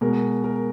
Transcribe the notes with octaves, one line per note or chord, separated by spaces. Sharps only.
B2 G#3 A#4
A#4